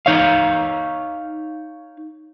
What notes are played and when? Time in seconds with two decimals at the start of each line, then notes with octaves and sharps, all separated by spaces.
0.06 D#4 C#5 F5